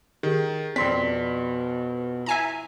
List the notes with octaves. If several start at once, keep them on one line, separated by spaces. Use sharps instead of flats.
D#3 G4 G#4
F2 B2 C4 D5 C6 B6
E4 E5 G#5 A#5